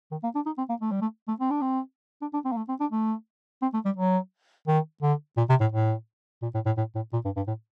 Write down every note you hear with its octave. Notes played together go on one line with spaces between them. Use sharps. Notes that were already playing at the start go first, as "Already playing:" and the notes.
D#3
A#3
D4
D#4
C4
A#3
A3
G3
A3
A3
C4
D4
C4
D4
D4
C4
A#3
A3
C4
D4
A3
C4
A3
G3
F#3
D#3
D3
A#2
C3
A2
A2
A#2
A2
A2
A2
A2
A#2
G2
G2
A2